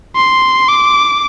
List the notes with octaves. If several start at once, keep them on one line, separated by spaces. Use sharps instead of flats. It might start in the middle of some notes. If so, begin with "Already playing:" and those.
C6
D6